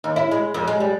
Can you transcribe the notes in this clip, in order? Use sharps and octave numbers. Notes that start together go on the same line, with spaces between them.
D#2
E4
G#3
F2
G#3
G3